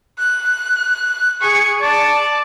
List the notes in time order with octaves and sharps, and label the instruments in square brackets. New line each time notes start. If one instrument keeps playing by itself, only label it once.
[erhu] F#6
[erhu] G#4 [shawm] C#6
[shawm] D5 [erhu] A5